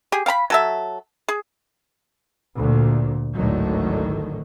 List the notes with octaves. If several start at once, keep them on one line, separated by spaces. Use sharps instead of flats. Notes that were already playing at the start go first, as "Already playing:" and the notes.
G4 G#4
F5 G5 A#5 B5
F#3 A4 E5
G#4
D2 A#2
G#1 D2 A2 D3 D#3 F#3